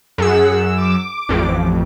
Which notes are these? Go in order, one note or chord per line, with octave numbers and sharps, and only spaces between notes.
F#2 G#4 F#5 E6
D6
A1 F2